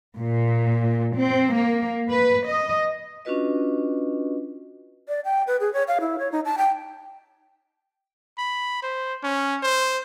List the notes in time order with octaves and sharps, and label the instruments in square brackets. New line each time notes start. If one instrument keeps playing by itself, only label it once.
[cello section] A#2
C4
A#3
B4
D#5
[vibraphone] C#4 D4 F4 F#4 B4 D#5
[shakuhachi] D5
G5
B4
G#4
C#5
F5
E4
C#5
D#4
A5
G5
[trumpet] B5
C5
C#4
C5